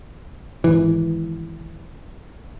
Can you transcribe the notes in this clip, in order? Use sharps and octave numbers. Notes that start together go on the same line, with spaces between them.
G#1 E3